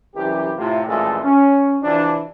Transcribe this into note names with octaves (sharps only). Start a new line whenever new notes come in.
C2 F#2 E3 G4
A2 C3 F4
A1 F2 A#2 G#3 A3 A4
C#4
C3 E3 F3 D4